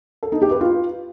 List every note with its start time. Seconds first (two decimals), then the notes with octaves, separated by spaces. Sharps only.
0.23 A4
0.32 D#4
0.42 G4
0.51 B4
0.61 F4